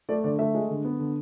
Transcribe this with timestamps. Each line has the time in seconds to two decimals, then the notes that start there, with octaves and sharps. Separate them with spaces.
0.09 A3 D5
0.24 D3 D5
0.39 A3 E5
0.55 G#3
0.70 D3
0.85 B3
0.99 D3